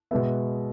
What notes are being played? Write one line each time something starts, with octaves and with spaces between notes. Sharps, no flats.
B2 G#3 B3 E5